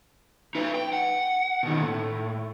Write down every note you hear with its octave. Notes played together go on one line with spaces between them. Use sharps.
D#4 B4
G5
F#5
B2 D#3
A2